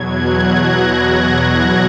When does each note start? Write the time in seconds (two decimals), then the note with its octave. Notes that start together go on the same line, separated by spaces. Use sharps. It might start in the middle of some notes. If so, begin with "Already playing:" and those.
Already playing: E2 B2 F#3 G#6
0.08 F#6
0.38 A#6